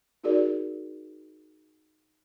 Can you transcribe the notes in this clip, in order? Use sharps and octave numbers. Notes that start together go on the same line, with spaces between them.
D#4 F#4 G#4 A#4 D5